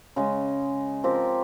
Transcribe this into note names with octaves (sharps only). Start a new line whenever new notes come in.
C#3 G#3 C#4
F3 C4 G4 A#4